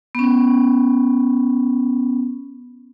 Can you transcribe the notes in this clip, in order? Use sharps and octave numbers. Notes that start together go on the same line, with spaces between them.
B3 C#4